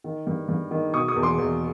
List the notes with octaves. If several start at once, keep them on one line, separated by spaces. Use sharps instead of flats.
D#3
G2
G2
D#3
B2 C#6 D#6
C#6 D#6
E2
C6 D6
E2